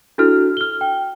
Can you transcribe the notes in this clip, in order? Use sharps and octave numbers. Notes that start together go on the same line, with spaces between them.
D4 E4 F#4 A4 F6
F6 G7
G5